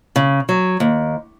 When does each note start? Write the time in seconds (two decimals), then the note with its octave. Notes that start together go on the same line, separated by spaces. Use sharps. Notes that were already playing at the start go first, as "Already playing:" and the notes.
0.16 C#3
0.49 F#3
0.80 D#2